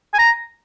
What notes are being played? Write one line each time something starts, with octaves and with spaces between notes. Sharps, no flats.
G#5
A#5